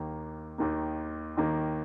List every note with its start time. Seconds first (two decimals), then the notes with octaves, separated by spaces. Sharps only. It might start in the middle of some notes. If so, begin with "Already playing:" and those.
Already playing: D#2 D#3 A#3
0.58 D#2 D#3 A#3
1.37 D#2 D#3 A#3